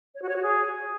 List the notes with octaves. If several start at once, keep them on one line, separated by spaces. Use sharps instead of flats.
C#5
F#4
C#5
F#4
G#4